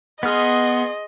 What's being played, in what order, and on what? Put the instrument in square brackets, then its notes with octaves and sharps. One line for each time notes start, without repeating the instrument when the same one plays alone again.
[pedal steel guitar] B3 F6 [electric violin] G#4 C6 [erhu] D#5